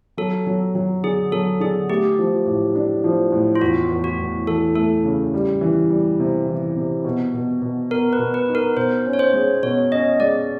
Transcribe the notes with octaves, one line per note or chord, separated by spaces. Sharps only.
F#3 A4
F#3
F#3
D3 G#4
F#3 A4
D3 G#4
A3 G4
F3
A2
D4
F3
A2
F4
E2 F#4
E2
F#4
E2
E3 A4
A3 A4
C#3
G3
E3
G3
C3
E3
C3
B2
B2
B2
B3 A#4
B4
B2
B4
D#4
A#4
B2 C5
C#4
C#5
C5
G#3
B2 C#5
C#4 D#5
G#3 D5